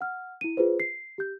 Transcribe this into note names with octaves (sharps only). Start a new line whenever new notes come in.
F#5 F6
E4 D#7
F4 G#4 B4 C5
C7
G4 G6